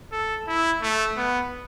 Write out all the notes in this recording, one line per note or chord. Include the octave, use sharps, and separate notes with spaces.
A4
E4
A3
B3